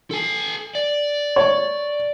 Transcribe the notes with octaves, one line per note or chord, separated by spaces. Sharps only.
A4 G#5
D5
C#5